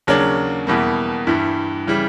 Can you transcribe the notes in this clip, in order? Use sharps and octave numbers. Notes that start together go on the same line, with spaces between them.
D#2 C#3 F#3 A#3 D4
E2 B2 G3 A#3
G2 E3 G3
C#3 E3 G3